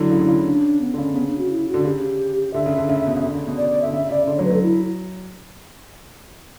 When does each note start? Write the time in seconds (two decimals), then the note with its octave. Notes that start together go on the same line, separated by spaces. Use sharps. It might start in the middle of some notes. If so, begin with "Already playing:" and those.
Already playing: D3 F#3 E4
0.11 C#3
0.20 D3
0.28 C#3
0.46 D4
0.81 B3
0.94 D3
0.98 C#3 C#4
1.15 C#3 B3
1.27 D4
1.38 F#4
1.51 E4
1.68 F#4
1.74 D3
1.85 C#3 G4
2.54 D3 E5
2.66 C#3
2.77 D3
2.89 C#3
3.06 B2
3.16 C#3
3.24 D3
3.35 C#3
3.47 B2
3.58 D5
3.69 D5
3.82 E5
3.85 D3
3.93 C#3 E5
4.11 C#3 D5
4.27 D3 D5
4.37 F#3 C#5
4.45 B4
4.50 F#3 A4
4.62 E4